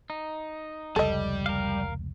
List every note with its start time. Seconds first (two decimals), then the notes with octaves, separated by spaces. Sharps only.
0.10 D#4
0.96 F1 C#2 G3 A4 D#5
1.46 A#4 F5